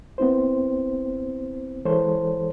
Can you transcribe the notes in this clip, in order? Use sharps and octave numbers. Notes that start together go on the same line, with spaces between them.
B3 C4 E4 C5
E3 G#3 A4 C5 C#5